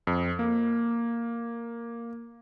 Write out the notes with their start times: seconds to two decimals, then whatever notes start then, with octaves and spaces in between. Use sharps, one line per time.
0.07 F2
0.39 A#3